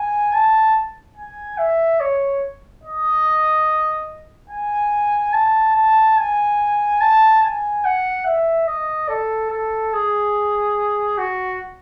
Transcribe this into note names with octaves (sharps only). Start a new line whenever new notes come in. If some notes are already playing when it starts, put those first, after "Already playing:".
Already playing: G#5
A5
G#5
E5
C#5
D#5
G#5
A5
A5
G#5
A5
G#5
F#5
E5
D#5
A4
A4
G#4
F#4